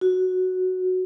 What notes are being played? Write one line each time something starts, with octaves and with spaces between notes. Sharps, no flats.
F#4